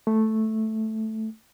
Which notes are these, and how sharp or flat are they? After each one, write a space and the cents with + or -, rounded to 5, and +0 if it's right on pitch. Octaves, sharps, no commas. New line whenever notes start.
A3 -5